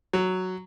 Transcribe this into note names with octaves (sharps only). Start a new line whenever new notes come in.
F#3